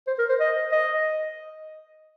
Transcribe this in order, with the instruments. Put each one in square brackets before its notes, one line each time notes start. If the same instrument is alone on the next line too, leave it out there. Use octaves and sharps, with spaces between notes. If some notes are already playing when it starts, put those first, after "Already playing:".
[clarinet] C5
A#4
C5
D#5
D#5